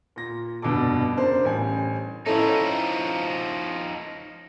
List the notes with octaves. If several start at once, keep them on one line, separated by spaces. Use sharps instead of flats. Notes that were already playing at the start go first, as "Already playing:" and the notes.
A#2 A#6
F1 G2 B2 D4 A4 D6
C#3 D4 A#4 C5
A1 G3 G#5
F3 C#4 D#4 E4 A4 C#5 D#5